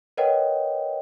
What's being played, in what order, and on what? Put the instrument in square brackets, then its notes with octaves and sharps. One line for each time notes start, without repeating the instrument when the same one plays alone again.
[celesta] A#4 B4 C#5 D#5 F#5 G5